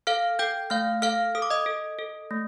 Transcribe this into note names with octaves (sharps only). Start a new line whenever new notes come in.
A4 F5 F6
A4 G5 G6
A3 F5 F6
A4 F5 F6
A4 D#6
D6
D#5 D#6
A4
A4
A3